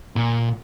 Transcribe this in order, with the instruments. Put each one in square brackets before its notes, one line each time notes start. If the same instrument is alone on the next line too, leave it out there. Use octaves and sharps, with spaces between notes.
[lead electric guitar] A#2